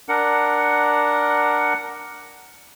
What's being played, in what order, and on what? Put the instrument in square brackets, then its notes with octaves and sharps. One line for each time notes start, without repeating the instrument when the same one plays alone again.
[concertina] D4 A#4 F#5